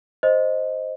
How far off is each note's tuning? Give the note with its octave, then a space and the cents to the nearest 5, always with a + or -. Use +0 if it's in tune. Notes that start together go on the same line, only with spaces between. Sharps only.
C5 +0 D#5 +0